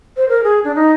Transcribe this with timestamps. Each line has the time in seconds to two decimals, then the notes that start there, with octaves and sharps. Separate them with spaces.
0.17 C5
0.29 A#4
0.43 G#4
0.64 D4
0.75 D#4